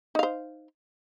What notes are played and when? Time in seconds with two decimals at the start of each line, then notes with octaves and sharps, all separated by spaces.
0.15 D#4
0.19 F5
0.23 C5